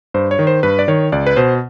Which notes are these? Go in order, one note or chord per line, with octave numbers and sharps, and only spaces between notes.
G2 C5
C#5
D#3
C5
G2 B4
D5
D#3 C#5
C#2 D5
B4
B2 C5